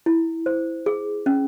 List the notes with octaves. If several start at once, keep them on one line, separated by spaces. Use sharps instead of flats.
E4
C5
G#4
C#4